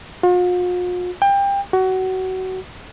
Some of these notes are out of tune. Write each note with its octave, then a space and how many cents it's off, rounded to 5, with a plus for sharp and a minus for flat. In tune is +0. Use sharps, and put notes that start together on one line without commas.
F4 +45
G5 +25
F#4 +20